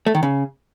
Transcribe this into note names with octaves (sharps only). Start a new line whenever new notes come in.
A3
D#3
C#3